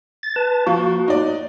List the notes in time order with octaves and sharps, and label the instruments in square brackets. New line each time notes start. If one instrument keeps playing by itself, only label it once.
[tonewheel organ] A6
B4 A5
[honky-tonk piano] F3 [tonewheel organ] A#3 F#4
[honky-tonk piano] D#4 D5